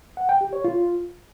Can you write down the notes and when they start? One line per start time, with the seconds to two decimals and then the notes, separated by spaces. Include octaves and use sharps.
0.17 F#5
0.29 G5
0.41 G4
0.53 C#5
0.64 F4